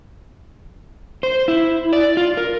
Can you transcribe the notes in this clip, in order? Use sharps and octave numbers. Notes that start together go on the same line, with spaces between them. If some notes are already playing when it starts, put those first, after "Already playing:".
C5
E4
D5
F4
A#4